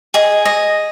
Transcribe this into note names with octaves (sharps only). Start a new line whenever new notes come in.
G#4 D#5
D#5